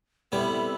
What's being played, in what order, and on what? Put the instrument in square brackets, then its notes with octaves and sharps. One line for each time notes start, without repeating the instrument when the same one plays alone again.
[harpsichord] C3 G3 B3 E4 [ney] A4